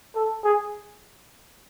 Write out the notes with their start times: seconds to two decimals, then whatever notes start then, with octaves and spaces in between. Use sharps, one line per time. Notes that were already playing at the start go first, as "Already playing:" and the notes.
0.16 A4
0.44 G#4